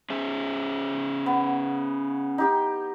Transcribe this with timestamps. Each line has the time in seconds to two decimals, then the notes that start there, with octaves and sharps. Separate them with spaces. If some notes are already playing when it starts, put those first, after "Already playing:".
0.10 C#4 G#4 E5
1.26 B3
2.38 D#4 G4 G5